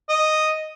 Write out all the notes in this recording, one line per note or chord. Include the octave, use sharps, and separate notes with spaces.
D#5